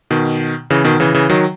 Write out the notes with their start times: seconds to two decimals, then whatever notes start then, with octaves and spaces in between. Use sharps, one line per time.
0.10 B2 D#3
0.70 C#3 E3
0.84 B2 D#3
1.00 C#3 E3
1.14 C#3 E3
1.30 D#3 F#3